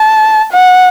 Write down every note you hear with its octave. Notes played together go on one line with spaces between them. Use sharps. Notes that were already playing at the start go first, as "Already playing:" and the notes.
Already playing: A5
F#5